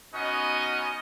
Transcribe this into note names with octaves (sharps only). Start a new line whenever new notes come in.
B3 C#4 D#4 F#4 D#5